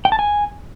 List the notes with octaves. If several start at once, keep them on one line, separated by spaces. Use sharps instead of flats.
G5
A5
G#5